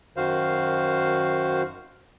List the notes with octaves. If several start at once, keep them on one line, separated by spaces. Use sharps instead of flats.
F#2 D#3 F#4 C5 F5